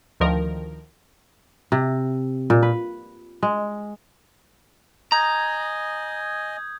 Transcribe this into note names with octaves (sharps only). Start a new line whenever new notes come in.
D2 D#3 F3 A#4
C3
A#2
B4
G#3
D#5 G#5 A#5 D#6 G6 G#6